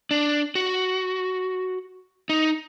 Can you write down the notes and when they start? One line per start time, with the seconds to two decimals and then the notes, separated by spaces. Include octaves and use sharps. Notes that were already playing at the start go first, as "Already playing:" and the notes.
0.11 D4
0.55 F#4
2.29 D#4